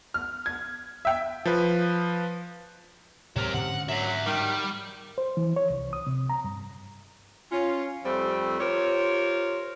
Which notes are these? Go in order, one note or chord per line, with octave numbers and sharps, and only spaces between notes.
F6
G#6
E5 G5
F3 B4
G#2 C3 F#3 A#4
G#2 D3 C#4 F#5
F#3 E5 F#5
D#3 G3
C5
E3
C#5
C2
D#6
C3
A#5
G2
C#4 F4
F2 G3 A3 C4
F4 G4 A#4 C5 C#5